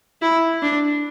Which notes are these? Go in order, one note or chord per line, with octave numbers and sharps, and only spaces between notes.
E4
D4